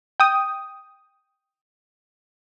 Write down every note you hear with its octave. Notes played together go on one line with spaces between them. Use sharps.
G5 D#6